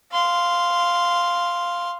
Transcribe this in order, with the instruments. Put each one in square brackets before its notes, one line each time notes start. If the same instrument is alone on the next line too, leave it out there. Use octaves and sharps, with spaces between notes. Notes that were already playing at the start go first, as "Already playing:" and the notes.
[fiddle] F5 C6